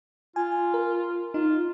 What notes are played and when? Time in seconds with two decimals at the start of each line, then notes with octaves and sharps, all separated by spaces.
0.36 F4 G#5
0.74 A#4
1.34 D#4 F4